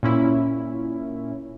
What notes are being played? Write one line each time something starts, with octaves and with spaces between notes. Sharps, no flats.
A#2 C#4 E4